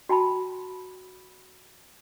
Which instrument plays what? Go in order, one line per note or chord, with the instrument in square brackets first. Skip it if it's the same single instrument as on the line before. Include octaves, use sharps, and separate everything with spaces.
[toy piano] F#4 G5 A5 B5